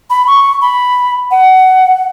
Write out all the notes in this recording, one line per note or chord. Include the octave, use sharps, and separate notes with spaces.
B5
C#6
B5
F#5